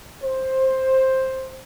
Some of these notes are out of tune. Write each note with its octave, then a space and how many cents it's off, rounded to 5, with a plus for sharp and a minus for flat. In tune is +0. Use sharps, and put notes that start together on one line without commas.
C5 +10